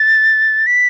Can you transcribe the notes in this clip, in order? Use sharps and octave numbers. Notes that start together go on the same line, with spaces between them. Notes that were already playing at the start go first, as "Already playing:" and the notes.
Already playing: A6
B6